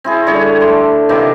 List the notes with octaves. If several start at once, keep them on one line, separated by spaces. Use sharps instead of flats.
C4 E4 G#4
D3 G3 G#4 C#5
A3 C6 D6
C3 D#3 E3 A#3